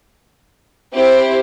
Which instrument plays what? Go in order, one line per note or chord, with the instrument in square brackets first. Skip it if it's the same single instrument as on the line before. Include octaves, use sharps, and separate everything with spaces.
[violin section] C4 E4 G4 C5